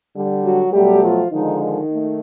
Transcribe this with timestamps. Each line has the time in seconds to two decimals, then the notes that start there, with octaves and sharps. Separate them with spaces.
0.14 D3 G3
0.43 F#3 F#4
0.72 B2 F#3 G3 A3 G4
1.02 F3 F4
1.32 D3 D#3 F3 G#3 D#4
1.61 D#3 D#4
1.91 A3